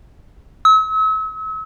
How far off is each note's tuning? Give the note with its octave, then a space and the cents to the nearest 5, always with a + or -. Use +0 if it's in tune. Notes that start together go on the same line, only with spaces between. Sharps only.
E6 -40